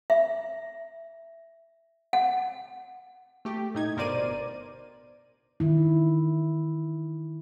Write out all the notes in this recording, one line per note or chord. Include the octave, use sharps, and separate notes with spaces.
E5
F#5
A3 G4
A2 D#4 G#6
G1 B2 A#4 C5 D5 D#7
D#3 E4